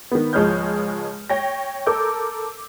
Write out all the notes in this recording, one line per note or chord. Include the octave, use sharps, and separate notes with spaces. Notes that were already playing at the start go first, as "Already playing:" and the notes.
D#3 B3
C#2 F3 G#3 C#5 F6 G6
C#5 G5 A#6
A4 A#4 D6 E6 G6